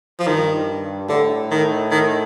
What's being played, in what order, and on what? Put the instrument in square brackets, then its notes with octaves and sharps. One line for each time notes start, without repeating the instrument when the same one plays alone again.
[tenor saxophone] F3
[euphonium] G2 [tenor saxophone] D#3
[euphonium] A2 [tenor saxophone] D3
[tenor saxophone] D#3
D#3